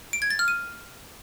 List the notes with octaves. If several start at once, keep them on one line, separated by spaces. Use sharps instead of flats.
D7
G#6
A6
F6
D#7